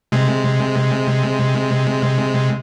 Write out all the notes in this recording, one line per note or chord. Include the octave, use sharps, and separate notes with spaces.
C3 G#3